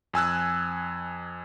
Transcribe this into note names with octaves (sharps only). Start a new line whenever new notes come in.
F2 G#5 E6 F#6